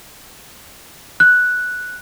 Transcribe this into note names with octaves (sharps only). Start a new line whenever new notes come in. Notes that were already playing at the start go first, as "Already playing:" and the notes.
F#6